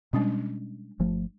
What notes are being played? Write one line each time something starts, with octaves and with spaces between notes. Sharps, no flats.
B2 G3 G#3 C#4 D4
G1 F3 A3